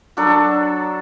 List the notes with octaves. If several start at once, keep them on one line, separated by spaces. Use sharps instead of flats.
F#3 D4 A4